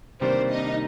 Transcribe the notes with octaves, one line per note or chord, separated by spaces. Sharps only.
C3 D#3 G3 A#3 C4 D4 C5
D#4 D#5